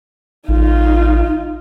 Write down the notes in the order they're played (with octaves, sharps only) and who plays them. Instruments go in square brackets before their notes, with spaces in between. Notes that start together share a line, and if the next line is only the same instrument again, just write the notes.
[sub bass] A1 [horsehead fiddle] D#4 F4